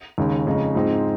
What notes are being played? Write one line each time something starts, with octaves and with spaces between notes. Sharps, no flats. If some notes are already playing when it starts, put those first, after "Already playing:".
D#2 C#3 G#3 D#4
F2 C#3 G#3 D#4
G#2 F3 G#3 C4 D#4